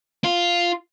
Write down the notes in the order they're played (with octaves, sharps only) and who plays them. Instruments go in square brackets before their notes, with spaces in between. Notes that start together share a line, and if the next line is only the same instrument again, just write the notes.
[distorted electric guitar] F4